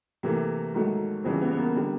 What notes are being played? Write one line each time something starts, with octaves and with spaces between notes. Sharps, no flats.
C3 E3 A3 A#3
G#2 D#3 F#3 A3
F2 C#3 E3 G3 C4
B3
B3
A#3
D3 G3